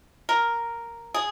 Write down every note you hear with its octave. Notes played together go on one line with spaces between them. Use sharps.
A#4
G#4